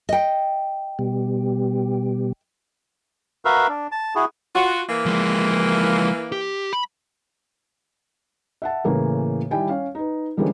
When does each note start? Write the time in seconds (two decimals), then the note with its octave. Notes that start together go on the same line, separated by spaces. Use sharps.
0.09 D#5 G5
0.99 B2 G3
3.45 F#4 A#4 B4 E5 F5
3.69 D4
3.92 A5
4.15 E4 F#4 G#4
4.55 F4 F#4
4.89 E3 A#3
5.06 F3 G#3
6.32 G4
6.73 B5
8.62 E5 F#5 A5
8.84 A2 C#3 E3 A#3 C#4
9.51 D#3 G3 E4 G5 G#5
9.69 C#4 F5
9.95 D#4 B4
10.37 D3 E3 G3 G#3 A#3 C#4